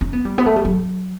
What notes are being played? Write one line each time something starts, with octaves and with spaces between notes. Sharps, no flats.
C#4
B3
G3
B3
A3
G3
F#3